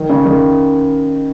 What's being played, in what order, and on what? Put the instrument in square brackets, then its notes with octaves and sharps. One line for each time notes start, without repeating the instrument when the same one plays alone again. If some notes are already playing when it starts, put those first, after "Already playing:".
Already playing: [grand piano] D#3
C#3
D#3